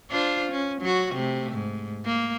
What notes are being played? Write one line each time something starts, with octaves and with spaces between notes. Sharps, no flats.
D4 F4 C5
C#4
F#3 F#4
C3 A3
G#2
A#3